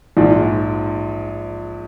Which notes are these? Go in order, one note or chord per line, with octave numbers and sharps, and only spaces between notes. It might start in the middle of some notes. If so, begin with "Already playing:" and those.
A#1 G#2 F3